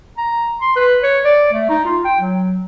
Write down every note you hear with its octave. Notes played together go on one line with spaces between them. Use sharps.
A#5
C6
B4
C#5
D5
A3
D#4
F4
G5
F#3